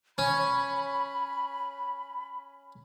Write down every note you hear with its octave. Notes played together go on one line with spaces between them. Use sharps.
C#4 B5